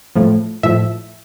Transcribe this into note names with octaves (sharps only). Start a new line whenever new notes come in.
A2 F3
A2 F3 E5